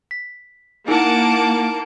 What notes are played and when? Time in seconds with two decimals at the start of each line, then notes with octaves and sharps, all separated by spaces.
0.11 B6
0.88 A#3 D#4 E4 F#5 A5 D6